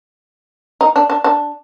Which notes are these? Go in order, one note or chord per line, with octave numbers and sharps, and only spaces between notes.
D#4
D4
D4
D4